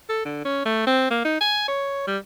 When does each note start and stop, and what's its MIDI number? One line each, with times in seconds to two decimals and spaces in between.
0.09 0.22 69
0.25 0.44 50
0.45 0.63 61
0.65 0.84 57
0.87 1.10 60
1.11 1.24 58
1.25 1.40 63
1.41 1.68 80
1.68 2.03 73
2.07 2.17 55